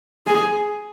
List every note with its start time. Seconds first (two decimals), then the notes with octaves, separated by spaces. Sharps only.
0.27 G#4